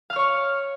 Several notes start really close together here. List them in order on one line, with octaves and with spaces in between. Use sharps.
F5 F6 C#5 C#6